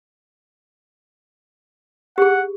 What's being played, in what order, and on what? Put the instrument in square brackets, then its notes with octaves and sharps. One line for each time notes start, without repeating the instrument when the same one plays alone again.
[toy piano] G4 G#4 [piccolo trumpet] F#5